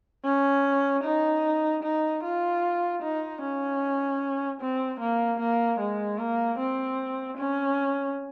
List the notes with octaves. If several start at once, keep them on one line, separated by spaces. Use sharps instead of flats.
C#4
D#4
D#4
F4
D#4
C#4
C4
A#3
A#3
G#3
A#3
C4
C#4